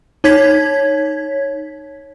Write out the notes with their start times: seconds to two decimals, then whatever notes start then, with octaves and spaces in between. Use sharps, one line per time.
0.24 D#4 C#5 G#6 B6